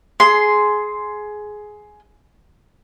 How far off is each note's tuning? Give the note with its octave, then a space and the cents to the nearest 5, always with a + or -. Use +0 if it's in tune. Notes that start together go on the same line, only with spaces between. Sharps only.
G#4 +15 C6 -5